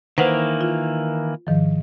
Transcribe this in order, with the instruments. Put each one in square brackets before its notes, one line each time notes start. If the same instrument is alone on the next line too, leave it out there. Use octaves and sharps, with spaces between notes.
[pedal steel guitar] D#3 E3 A#3 [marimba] B4 C5 F#5
[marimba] F4
G#2 D#3 F3